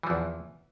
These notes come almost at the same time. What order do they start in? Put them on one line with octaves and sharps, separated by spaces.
E3 F3 E2